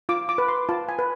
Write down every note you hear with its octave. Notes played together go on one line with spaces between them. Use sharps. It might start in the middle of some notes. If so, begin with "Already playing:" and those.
F4 D6
D6
B4
C6
F4 A5
G#5
B4